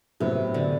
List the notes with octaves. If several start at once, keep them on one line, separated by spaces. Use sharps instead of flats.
A2 C3 F#3 B3 E4
D3